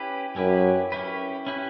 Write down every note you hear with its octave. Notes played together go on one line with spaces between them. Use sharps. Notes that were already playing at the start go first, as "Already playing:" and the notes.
Already playing: C#4 E4 G4 B4
F#2 C#4 E4 G4 B4
C#4 E4 G4 B4
C#4 E4 G4 B4